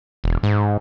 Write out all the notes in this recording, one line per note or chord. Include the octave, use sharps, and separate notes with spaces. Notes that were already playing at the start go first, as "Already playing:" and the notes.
E1
G#2